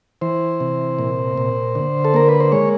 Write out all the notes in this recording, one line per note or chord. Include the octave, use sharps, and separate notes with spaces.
E3 C5
C3
A#2
A#2
D3
A4
A#3 A#4
B4
C5
G#3 C#5